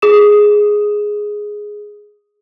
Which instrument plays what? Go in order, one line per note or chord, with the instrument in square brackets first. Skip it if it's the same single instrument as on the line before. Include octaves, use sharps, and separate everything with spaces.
[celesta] G#4 D#6 E7